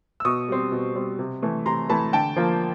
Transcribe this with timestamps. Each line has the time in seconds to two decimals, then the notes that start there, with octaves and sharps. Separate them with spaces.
0.20 E6
0.25 B2 C#6 D#6
0.48 G3 C4
0.72 B2
0.96 G3 C4
1.19 C3
1.42 E3 A3
1.66 C3 A#5 C6
1.89 E3 A3 A5 B5
2.13 D3 G5 A5
2.36 F3 A#3